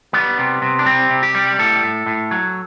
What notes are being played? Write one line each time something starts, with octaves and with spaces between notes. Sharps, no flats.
G3 B3
C3
C3
D4
G3 C4
C3
G4
G3
A2 A4
A2
A2
F#3